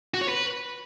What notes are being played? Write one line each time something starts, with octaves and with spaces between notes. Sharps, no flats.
F#4
C#5
B4